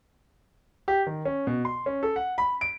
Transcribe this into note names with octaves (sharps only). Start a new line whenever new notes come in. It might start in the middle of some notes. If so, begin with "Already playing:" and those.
G4
D#3
C#4
B2
C6
C#4
A4
F#5
B5
D7